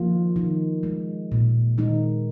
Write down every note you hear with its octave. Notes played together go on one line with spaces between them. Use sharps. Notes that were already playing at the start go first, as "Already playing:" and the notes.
Already playing: D#3 F3 A#3 F4
D#3
G#3
A#2
D#3 G#3 D#4